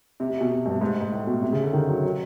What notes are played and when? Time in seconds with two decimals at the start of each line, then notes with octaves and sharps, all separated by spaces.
0.20 C3
0.31 C3
0.40 B2
0.51 B2
0.66 G2
0.81 G#2
1.01 G#2
1.12 A2
1.27 B2
1.42 C3
1.52 C#3
1.63 D3
1.73 D#3
1.88 F#3
2.03 F#3